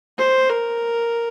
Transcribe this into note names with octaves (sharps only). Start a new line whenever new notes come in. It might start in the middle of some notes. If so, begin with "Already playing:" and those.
C5
A#4